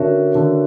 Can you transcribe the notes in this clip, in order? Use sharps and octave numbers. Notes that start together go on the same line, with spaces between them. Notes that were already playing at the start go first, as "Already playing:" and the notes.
Already playing: D3 C#4 F#4 A#4 C#5 E5
D3